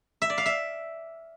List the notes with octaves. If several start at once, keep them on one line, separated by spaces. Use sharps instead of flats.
E5
D5
F5
E5